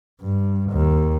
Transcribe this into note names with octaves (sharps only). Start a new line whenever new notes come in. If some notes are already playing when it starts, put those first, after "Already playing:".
G2
D#2